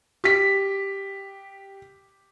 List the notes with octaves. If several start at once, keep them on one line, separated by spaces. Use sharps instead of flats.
G4 B6